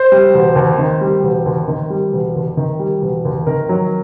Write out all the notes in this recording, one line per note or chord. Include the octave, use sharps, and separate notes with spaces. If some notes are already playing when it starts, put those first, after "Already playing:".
Already playing: C5
G3
E1
D#2
D#3
G3
E1
D#2
D#3
G3
E1
D#2
D#3
G3
E1
D#2
D#3 A#4
F#3